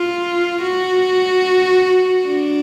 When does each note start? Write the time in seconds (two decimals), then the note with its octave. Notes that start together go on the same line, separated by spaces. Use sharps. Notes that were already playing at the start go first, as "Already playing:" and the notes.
Already playing: F4
0.62 F#4
2.27 D4